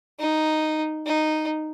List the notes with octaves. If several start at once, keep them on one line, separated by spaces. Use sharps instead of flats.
D#4
D#4